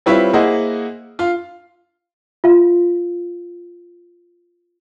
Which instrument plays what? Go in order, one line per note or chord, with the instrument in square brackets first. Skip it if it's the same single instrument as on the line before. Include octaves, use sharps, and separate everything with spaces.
[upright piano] G3 C4 E4 F4 B4 C#5
A#3 E4 G#4 C5 D#5 F#5
F4 F5
[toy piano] F4 F5